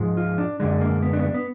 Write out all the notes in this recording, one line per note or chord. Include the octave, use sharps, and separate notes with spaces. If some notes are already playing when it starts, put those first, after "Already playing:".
Already playing: G#2 F3 G#3
F4
D4
F#2 D3 G#3 D4
A#3
B3
D4
B3
D4
B3